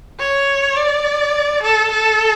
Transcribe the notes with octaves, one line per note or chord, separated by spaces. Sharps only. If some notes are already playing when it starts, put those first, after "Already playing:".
C#5
D5
A4
A4